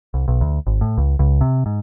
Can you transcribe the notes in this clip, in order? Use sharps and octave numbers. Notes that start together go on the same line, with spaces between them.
C2
B1
D2
G#1
A2
C#2
C#2
C3
G#2